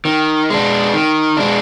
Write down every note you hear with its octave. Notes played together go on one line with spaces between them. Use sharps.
D#3
G#3 D4
D#3
G#3 D4